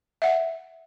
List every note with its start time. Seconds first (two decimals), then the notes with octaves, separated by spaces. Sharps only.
0.22 E5 F#5